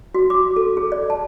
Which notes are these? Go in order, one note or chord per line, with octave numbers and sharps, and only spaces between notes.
F#4
D6
A4
G#4
D5
A5